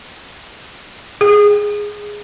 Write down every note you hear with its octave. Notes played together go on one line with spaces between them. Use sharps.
G#4